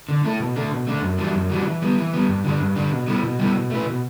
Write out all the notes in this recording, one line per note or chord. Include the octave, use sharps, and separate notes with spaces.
D3
A3 E4 A4
B2
A3 D4 A4
B2
A3 D4 A4
F#2
E3 G3 D4 F#4
F#2
E3 G3 D4 F#4
E3
G3 B3
E3
G3 B3
G2
D3 G3 D4
G2
D3 G3 D4
B2
G3 B3 E4 A4
B2
G3 B3 E4 A4
B2
A3 E4 B4
B2